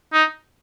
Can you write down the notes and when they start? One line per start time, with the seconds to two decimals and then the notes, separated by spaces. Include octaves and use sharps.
0.13 D#4